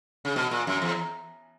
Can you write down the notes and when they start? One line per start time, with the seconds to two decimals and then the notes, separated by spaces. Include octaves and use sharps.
0.25 C#3
0.36 B2
0.51 A#2
0.67 F#2
0.82 E2